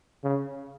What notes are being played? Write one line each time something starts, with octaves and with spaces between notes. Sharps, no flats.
C#3